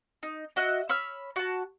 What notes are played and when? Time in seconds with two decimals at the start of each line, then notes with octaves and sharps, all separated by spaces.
0.23 D#4
0.56 F#4 D#5 E5 F#6
0.89 C#5 B5 E6 F6
1.36 F#4 A5